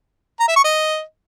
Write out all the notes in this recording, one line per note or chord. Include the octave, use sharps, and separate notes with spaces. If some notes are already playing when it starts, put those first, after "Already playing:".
A#5
E5
C#6
D#5